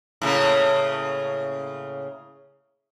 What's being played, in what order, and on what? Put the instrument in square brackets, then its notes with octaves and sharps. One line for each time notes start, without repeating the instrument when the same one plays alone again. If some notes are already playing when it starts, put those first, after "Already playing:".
[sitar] A2 C#3 A#3